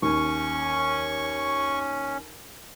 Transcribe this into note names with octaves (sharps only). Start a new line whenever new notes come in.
D#2 C#4 C#6